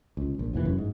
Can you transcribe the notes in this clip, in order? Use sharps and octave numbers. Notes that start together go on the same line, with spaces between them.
C#2
A#1
F1 D#2 A#2 E3
F#2
G#2